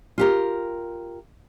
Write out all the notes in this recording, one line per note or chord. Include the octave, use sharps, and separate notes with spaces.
F4 G4 A#4